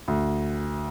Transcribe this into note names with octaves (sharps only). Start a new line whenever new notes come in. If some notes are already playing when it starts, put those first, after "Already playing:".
D2